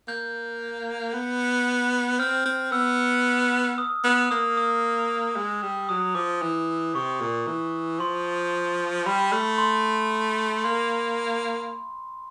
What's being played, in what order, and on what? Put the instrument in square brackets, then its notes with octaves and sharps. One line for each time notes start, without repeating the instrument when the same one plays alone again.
[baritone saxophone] A#3 [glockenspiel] G6
[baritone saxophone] B3
[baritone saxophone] C4 [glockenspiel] F6
[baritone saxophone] C4
[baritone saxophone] B3 [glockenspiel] E6
[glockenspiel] D#6
[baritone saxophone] B3
[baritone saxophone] A#3 [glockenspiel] D#6
[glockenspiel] D#6
[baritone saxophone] G#3
G3
[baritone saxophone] F#3 [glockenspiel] D#6
[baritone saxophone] F3 [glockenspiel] D6
[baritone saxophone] E3
[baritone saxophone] C3 [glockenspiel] C#6
[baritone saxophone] A#2
E3
[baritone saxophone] F3 [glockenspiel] C6
[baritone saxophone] G3 [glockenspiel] B5
[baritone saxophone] A3
[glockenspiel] C6
[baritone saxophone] A#3 [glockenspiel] C6